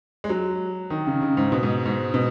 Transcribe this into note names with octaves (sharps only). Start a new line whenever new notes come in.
G#3
F#3
D#3
C#3
C#3
G#2
B2
G#2
G#2
B2